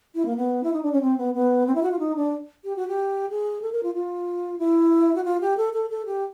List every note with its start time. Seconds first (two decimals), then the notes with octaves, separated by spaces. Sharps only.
0.15 E4
0.26 A#3
0.37 B3
0.63 E4
0.73 D#4
0.83 D4
0.92 C#4
1.01 C4
1.18 B3
1.34 B3
1.67 C4
1.75 E4
1.83 F#4
1.91 F4
1.99 D#4
2.16 D4
2.64 G4
2.76 F#4
2.88 G4
3.30 G#4
3.62 A4
3.72 A#4
3.83 F4
3.95 F4
4.59 E4
5.15 F#4
5.24 F4
5.41 G4
5.57 A4
5.73 A4
5.90 A4
6.06 G4